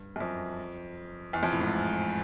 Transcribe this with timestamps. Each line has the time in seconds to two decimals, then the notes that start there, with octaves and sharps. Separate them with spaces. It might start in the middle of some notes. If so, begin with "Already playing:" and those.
Already playing: G2
0.16 F#2
0.20 F2
1.33 E2
1.43 F2
1.52 A2
1.61 G#2